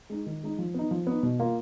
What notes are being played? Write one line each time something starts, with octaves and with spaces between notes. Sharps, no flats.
G#3 D#4
D#3
G#3 D#4
F3
B3 D#4
F3
B3 D#4
B2
A#3 F4